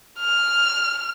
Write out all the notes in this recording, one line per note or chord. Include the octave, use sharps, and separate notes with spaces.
F6